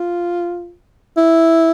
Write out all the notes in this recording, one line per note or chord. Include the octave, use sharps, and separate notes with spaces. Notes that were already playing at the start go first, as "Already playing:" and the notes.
Already playing: F4
E4